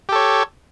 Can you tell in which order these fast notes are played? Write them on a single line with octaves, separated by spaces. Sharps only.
G4 A4 C#5